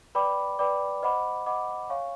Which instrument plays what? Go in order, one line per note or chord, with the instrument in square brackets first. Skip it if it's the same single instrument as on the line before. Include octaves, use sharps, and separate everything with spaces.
[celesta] B4 D5 G5 B5 D6
B4 D5 G5 B5 D6
C5 D#5 F#5 B5 D6
C5 D#5 F#5 B5 D6
C#5 F5 G#5 C#6